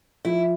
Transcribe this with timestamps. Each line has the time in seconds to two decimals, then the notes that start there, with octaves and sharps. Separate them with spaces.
0.25 F3 E4